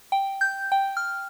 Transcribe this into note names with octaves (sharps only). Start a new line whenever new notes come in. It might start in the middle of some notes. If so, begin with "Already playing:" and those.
G5
G6
G5
F6